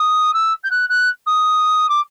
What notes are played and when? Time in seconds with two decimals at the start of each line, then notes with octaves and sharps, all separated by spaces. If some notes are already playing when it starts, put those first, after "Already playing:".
Already playing: D#6
0.33 E6
0.63 G6
0.70 F#6
0.89 F#6
1.26 D#6
1.89 D6